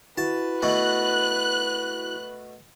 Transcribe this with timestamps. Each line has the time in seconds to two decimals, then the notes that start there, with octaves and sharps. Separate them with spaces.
0.18 E4 F#4 B4 A5
0.62 B2 A3 F#6